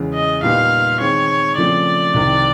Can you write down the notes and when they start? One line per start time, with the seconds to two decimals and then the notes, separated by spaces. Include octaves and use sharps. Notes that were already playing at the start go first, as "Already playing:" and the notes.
Already playing: E2 C#3 E3 G#3
0.14 D#5
0.43 A#2 G3 B3 D#4 G4 F5
1.00 D#3 G#3 C4 C#5
1.57 C#3 F3 A3 C4 D5
2.14 C2 C3 D#3